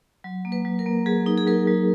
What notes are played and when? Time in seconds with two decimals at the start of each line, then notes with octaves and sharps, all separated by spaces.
0.24 F#3
0.45 A#3
0.52 B4
0.65 F#3
0.79 A#4
0.86 A#3
1.06 F#3 G#4
1.26 D#4
1.38 G#4
1.46 F#3 A#4
1.67 F#3